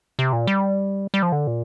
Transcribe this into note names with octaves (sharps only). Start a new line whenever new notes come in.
C3
A#2
G3
G3
F3
D3
A#2